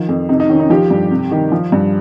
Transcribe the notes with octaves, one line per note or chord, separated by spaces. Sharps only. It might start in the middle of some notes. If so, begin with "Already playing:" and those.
Already playing: D#3 F3
F2
C3 D#4
D#4
D#3 C#4
D#4
F3 G4
G2
C3
D#3
F3
G2